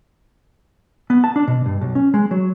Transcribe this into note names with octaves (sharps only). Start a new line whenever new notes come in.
B3
A5
D4
B2
G2
B1
C#4
G#3
F#3